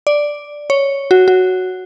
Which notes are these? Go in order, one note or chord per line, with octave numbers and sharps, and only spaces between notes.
D5
C#5
F#4
F#4